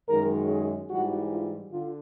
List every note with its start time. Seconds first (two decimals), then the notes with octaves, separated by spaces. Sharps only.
0.08 F#2 D#3 G#3 A#4
0.49 G#4
0.90 G#2 E3 G3 F#4
1.31 F4
1.71 D3 F4